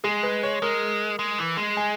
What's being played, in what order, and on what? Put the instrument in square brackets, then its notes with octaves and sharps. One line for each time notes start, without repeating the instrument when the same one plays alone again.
[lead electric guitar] G#3 [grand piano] G#4
[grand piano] B4
C#5
[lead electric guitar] G#3 [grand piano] A#4
[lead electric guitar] G#3
E3
G#3
[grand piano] G#5